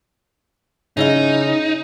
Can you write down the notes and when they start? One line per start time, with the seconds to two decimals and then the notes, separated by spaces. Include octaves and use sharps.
0.97 C#3 D#4 E4 D#5